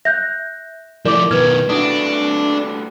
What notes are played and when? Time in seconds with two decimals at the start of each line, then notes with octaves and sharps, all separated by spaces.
0.05 E5 F#6 G6 A#6
1.05 F3 A3 E4 A#4 D5 D6
1.31 B2 D#3 B4 F6 G#6
1.69 A3 D4 E4 F#4 D#6